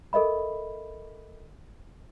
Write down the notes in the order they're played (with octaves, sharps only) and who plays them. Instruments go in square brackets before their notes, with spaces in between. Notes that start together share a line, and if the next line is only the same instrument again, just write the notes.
[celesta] A4 A#4 D#5 E5 B5